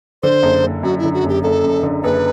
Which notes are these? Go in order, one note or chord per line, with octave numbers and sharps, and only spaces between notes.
D3 C5
F#1
F#1
F#2 F#4
D3 E4
F#4
F#1
G4
F#1 A4
F#2
D3
F#1 B4